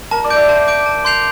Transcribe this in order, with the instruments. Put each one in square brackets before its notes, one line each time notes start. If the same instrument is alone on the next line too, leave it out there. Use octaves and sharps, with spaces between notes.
[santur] A#4 [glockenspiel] A5
[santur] D5
[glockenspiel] D6 G6 D7
[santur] E5
[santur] C5 [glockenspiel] A5
[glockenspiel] D6 G6 D7
A5
C6 G6 C7 F7